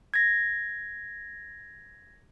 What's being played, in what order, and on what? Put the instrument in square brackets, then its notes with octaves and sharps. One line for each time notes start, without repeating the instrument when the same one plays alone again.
[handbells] G#6 A#6